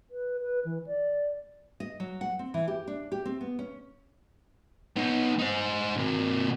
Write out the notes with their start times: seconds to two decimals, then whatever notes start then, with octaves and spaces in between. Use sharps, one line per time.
0.11 B4
0.41 B4
0.65 E3
0.87 D5
1.80 D#5
2.00 F#3
2.21 F#5
2.39 C4
2.54 E3
2.68 G4
2.87 D4
3.12 G4
3.25 C4
3.41 B3
3.59 C#4
4.96 B3 D#4
5.39 D#4 C5
5.97 C3 A#3